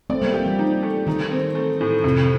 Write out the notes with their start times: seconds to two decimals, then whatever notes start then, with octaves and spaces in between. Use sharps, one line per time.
0.10 A3 C4 D5
0.21 G3 A#3
0.34 G3 G4
0.46 F3
0.59 D#4
0.83 A3
1.07 D#3 D#4
1.31 C4
1.55 A3
1.81 A2
2.04 F2 C3